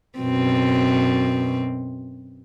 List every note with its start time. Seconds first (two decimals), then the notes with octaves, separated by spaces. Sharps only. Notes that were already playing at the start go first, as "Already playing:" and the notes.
0.19 F#2 B2 C4